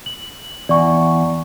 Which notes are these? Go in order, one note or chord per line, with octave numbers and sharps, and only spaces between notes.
F#7
E2 D5 C#6